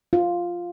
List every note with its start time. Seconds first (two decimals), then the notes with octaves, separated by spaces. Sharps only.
0.13 F4